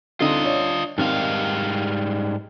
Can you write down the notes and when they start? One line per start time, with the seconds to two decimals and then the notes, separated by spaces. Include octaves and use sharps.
0.20 D3 C4 D#4 F4 D#5
0.44 D4 C#5
0.98 G#2 D#3 G3 C4 F5 F6